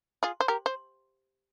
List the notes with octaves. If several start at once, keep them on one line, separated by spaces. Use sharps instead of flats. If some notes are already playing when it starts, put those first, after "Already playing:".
F4 G#4
C5
G4 A#4
C5